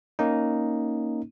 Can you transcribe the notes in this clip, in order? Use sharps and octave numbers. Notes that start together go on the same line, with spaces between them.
A#3 C#4 D#4